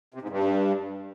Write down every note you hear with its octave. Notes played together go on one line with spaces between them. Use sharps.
C3
G#2
G2